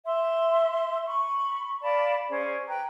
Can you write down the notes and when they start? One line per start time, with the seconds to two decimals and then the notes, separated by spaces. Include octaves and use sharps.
0.06 E5 C6
1.06 B5 C#6
1.82 D5 F5 A5 B5
2.29 C#4 G#4 C5 D5
2.67 B4 G5 A#5